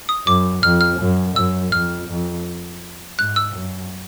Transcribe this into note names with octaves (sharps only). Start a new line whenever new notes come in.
D#6
F#2 D6
F2 F6
F6
F#2
F#2 E6
F2 F6
F2
G#2 F#6
E6
F#2